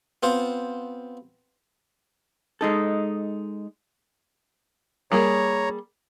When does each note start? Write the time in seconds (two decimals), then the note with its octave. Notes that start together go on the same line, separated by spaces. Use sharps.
0.23 B3 C4 F4 C5
2.61 G#3 D#4 A4
5.12 G3 A#3 G#4 C#5 A#5